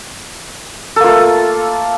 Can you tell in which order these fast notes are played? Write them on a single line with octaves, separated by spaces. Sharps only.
A4 A#3 F4 A3